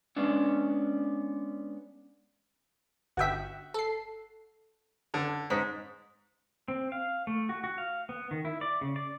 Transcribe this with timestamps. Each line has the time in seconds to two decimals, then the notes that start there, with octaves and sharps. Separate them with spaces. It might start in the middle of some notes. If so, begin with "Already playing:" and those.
0.16 G#3 B3 C#4 D4
3.17 G1 F#4 E5 G5 B6
3.74 A4 C7
5.14 D3
5.50 G#2 B6
6.68 C4
6.92 F5
7.27 A3
7.49 F#4
7.64 F#4
7.78 F5
8.09 B3
8.31 D#3
8.45 E4
8.61 D5
8.81 C#3
8.96 D5